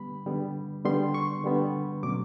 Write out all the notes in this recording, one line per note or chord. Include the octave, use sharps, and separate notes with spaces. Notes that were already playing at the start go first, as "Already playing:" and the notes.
Already playing: D3 G3 B3 B5
D3 G3 B3
D3 G3 B3 C6
C#6
D3 G3 B3
B2 F#3 A3 C#4 D6